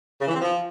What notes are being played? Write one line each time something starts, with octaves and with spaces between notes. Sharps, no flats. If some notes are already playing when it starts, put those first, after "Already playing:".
C#3
E3
C4
F3